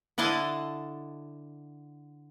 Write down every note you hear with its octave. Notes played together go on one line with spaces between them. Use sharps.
D3 E4 D#5 F5 A5